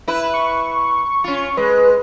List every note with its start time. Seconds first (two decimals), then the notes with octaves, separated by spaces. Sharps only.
0.08 E4 B4
0.33 C#6
1.24 C#4 F4
1.57 G#3 B4